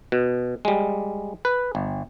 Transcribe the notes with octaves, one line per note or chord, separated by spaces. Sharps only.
B2
G3 G#3
B4
G1